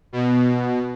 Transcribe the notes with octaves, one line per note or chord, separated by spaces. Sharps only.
B2